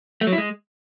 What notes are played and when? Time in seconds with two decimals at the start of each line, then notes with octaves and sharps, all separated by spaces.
0.21 A3
0.27 F#3
0.33 E4
0.38 G#3